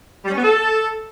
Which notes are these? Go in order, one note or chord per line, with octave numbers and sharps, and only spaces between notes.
G3
C#4
B3
A4